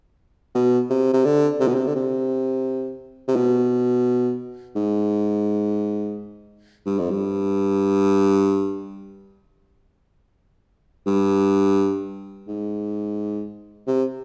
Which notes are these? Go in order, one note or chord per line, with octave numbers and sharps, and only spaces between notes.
B2
C3
C3
D3
C3
B2
C3
D3
C3
C3
B2
G#2
G2
F2
G2
G2
G#2
C3